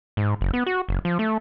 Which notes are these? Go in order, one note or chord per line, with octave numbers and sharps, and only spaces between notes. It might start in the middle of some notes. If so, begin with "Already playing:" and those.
G#2
F#1
B3
F#4
F#1
F3
A3